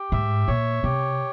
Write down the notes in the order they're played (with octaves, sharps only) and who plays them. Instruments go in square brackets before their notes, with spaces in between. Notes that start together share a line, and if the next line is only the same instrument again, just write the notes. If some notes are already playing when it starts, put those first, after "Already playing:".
Already playing: [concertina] G4
[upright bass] G#2 [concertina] E5
[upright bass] A#2 [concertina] C#5
[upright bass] C3 [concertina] G4